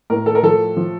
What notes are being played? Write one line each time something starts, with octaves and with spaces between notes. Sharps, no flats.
A2 A#4
A4
A#4
F3 A4
F3